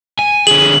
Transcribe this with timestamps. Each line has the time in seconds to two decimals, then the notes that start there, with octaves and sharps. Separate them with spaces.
0.19 G#5
0.47 D3 G#4 F#7